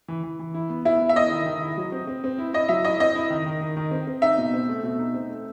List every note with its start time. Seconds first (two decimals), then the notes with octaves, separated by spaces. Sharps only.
0.08 E3
0.23 E3
0.39 E3
0.54 E4
0.70 B3
0.85 B3 E4
1.01 B3
1.09 E5
1.16 E4 D#5
1.31 D#3
1.46 D#3
1.62 E4
1.77 F#3
1.92 C4
2.07 C4
2.24 C4
2.38 E4
2.53 E4 D#5
2.69 F#3 E5
2.84 E4 D#5
3.00 C4 D#5
3.15 E4
3.30 D#3
3.46 D#3
3.61 D#3
3.77 D#3
3.91 C4
4.07 C4
4.22 D#4 E5
4.38 B2
4.54 C4
4.69 A3
4.83 B2
4.99 D#4
5.14 C4
5.30 A3